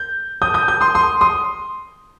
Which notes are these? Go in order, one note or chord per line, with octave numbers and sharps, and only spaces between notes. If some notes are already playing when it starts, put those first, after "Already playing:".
Already playing: G6
D#6 G6
D#6 G6
D#6 G6
C6 D#6
C6 D#6
C6 D#6